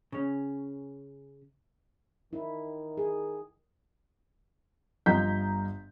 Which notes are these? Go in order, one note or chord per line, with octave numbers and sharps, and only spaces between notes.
C#3 C#4
D#3 E4
G#4
G1 F4 D#5 A#5 G6 B6